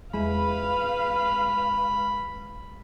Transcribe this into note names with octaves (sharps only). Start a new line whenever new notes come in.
E2 G#3 B4 E5 F5 B5